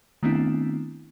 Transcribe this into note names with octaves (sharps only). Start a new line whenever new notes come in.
D#3 A3 B3 C4 D4 E4